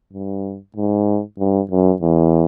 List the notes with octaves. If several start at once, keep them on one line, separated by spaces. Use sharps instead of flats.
G2
G#2
G2
F#2
E2